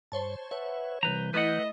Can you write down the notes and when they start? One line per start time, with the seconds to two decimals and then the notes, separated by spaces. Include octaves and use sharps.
0.12 G2 C5 C#5 A5
0.51 B4 C#5 E5 F#5
1.03 C2 E3 B4 A#5 G6
1.34 A3 E4 B4 D#5 F#5